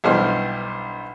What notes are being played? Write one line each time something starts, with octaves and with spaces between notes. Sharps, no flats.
B1 G2 B2 E3 C5 F6